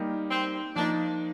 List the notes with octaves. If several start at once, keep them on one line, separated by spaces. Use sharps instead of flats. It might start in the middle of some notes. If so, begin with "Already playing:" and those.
Already playing: G3 A#3 D#4 G4
C4
F3 A#3 D4 D#4